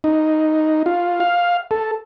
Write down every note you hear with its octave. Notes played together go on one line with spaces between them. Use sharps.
D#4
F4
F5
A4